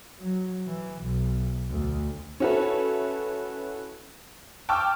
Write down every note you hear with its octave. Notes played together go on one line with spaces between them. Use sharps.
F#3
E3
B1
D2
C#4 E4 F#4 A4 B4
G5 A5 C#6 D6 E6 F6